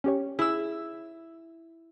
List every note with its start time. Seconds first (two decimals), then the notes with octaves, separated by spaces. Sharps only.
0.04 C#4 G4 C#5
0.39 E4 G#4 E6